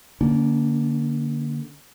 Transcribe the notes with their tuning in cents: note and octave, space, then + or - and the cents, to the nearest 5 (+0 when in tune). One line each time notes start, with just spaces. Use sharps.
D3 +0 A#3 +0 C#4 +40